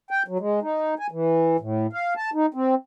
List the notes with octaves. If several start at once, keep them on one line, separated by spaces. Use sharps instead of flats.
G5
F#3
G#3
D#4
G#5
E3
A2
F5
A5
D#4
C4